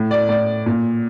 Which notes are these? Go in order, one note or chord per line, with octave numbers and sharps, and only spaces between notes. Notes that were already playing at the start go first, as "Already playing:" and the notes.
Already playing: A2
D5
A2 D5
A#2